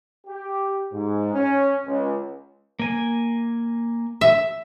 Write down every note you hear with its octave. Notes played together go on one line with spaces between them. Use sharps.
G4
G#2
C#4
C#2
A#3 G#5
E5